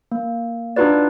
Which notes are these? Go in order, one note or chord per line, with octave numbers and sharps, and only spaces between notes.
A#3
D4 D#4 F4 F#4 B4 D5